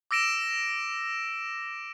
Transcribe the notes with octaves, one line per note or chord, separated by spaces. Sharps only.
D6 E6 A#6 D7 E7